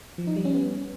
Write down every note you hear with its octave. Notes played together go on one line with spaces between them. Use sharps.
F3
D#4
G3
C#4
B3